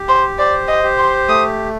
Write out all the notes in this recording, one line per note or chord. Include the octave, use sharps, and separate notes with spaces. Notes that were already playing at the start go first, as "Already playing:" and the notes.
Already playing: G4
C5
C5 D5
D#5
G4
C6
A3 D#6